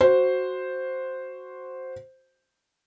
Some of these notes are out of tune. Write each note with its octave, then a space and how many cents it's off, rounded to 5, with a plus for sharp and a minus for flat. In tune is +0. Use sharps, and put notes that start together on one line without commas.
F#4 +0 C5 +0